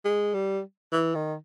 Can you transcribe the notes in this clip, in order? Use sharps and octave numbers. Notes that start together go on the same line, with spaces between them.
G#3
G3
E3
D#3